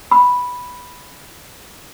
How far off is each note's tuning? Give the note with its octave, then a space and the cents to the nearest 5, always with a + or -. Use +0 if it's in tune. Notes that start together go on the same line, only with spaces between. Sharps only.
B5 -5